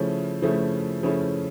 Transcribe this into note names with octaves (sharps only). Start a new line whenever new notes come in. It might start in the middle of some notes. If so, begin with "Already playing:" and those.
Already playing: C#3 F3 A3 C#4 E4
C#3 F3 A3 C#4 E4
C#3 F3 A3 C#4 E4